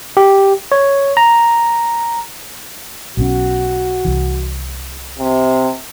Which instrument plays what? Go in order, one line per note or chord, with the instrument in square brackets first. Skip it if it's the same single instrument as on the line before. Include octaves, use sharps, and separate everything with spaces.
[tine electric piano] G4
C#5
A#5
[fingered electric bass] B1 B2 C#4 [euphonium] F#4
[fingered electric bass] C2 E3
[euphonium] C3